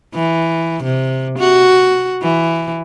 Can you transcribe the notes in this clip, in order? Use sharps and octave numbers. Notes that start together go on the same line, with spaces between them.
E3
C3
F#4
E3